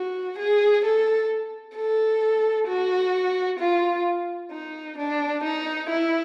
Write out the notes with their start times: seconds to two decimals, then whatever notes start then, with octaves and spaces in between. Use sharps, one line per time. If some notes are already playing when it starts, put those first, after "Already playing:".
Already playing: F#4
0.38 G#4
0.84 A4
1.76 A4
2.68 F#4
3.59 F4
4.51 D#4
4.97 D4
5.43 D#4
5.89 E4